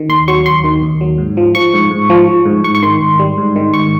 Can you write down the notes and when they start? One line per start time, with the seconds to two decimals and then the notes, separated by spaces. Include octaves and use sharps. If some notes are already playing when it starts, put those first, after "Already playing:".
Already playing: D#3
0.09 D#2 C6
0.28 F#3 C#6
0.46 D#2 C6
0.64 D#3
0.82 D#2
1.01 F#3
1.18 G#2
1.37 F3
1.55 F3 C#6
1.74 G#2
1.91 G#2
2.10 F3
2.28 F3
2.46 G#2
2.64 G#2 C#6
2.75 C#6
2.83 D#3 C6
3.01 G#2
3.19 G3
3.38 G#2
3.56 D#3
3.74 G#2 C#6